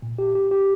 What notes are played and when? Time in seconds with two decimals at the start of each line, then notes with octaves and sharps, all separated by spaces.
0.02 A#2
0.18 G4
0.35 G4
0.51 G4